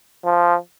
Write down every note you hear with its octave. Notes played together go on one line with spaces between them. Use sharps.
F3